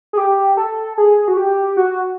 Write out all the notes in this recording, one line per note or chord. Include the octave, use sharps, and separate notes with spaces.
G#4
G4
A4
G#4
F#4
G4
F#4